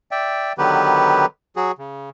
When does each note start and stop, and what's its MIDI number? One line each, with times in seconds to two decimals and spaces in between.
0.11 0.53 74
0.11 0.53 76
0.11 0.53 79
0.58 1.26 50
0.58 1.26 51
0.58 1.26 54
0.58 1.26 59
0.58 1.26 67
0.58 1.26 71
1.56 1.72 54
1.56 1.72 66
1.56 1.72 68
1.78 2.10 49